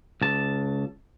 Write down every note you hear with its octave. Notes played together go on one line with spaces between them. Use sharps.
C#2 A5